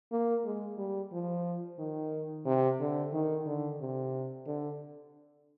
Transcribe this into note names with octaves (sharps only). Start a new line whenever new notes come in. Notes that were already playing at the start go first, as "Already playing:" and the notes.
A#3
G#3
G3
F3
D#3
C3
D3
D#3
D3
C3
D3